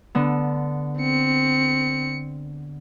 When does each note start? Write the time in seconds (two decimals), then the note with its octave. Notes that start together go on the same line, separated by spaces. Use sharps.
0.15 D3 B3
0.99 C4 C#7